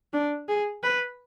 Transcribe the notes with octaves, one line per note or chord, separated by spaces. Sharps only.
D4
G#4
B4